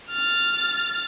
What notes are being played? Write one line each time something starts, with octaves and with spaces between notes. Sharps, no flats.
F6 A6